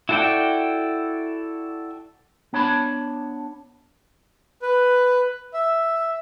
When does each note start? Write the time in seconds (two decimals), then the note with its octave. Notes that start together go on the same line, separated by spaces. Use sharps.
0.09 E4 F#4 A4 D5 G5
2.53 B3 D4 C#5 A5 B5
4.62 B4
5.54 E5